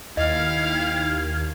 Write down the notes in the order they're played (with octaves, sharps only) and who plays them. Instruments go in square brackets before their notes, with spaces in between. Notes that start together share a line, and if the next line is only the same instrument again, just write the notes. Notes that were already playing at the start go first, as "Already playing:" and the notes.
[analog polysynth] D#2 [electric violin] E4 F5 [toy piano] D#5 [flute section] G5 F6 G#6